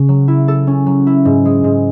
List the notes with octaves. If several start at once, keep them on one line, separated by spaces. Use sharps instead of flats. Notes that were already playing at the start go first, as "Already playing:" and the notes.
Already playing: C#3
F#3
E4
A4
C#4
F#3
E4
G#2
G#3
G#2